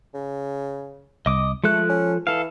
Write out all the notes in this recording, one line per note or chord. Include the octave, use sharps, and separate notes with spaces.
C#3
C2 D#5 D6 D#6
F3 G#3 A3 A4 F#6
C#4
E3 A4 F5